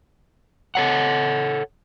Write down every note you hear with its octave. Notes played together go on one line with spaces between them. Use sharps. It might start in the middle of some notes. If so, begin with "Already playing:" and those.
A4 C#5 F#5